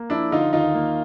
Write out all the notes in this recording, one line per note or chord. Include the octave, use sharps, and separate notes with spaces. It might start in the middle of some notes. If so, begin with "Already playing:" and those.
Already playing: A#3
F3 D4 E4
D3 D#4 F4
D#2 D#4 F4
A#3